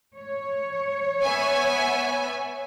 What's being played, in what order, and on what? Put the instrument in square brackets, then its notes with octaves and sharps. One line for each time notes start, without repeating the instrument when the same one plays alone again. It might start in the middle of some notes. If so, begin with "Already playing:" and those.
[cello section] C#5
[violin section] B3 E5 G#5